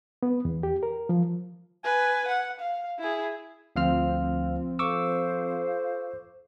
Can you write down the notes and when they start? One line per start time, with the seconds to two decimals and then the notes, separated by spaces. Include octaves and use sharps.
0.23 B3
0.45 E2
0.63 G4
0.83 A#4
1.09 F3
1.84 B4 G#5
2.28 F#5
2.59 F5
2.99 E4 G#4
3.76 D2 F3 C4 F5 F6
4.79 F4 A4 C5 C#6 D6 E6